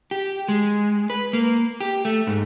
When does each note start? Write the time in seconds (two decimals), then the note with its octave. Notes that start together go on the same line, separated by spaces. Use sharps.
0.11 G4
0.48 G#3
1.10 B4
1.33 A#3
1.81 G4
2.05 A3
2.27 G#2